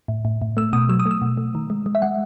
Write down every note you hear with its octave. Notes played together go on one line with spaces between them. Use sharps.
A2
A2
A2
A3 E6
B2 D#6
F#3 E6
D#6
A3
E6
B2
A3
D#3
G#3
G#3
E5
G#3 F#5